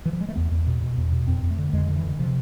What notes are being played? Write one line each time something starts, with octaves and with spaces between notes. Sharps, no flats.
E3
F3
G#3
A3
E2 B3
E2
B2
B2
E2
B2
F2 C4
F2
A3
D3
F2 G#3
D3
E3
D3
C3 F3